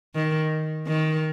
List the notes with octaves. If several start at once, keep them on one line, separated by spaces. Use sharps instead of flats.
D#3
D#3